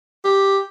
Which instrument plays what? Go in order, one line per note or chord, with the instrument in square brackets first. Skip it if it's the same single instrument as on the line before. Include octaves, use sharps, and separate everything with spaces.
[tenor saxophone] G4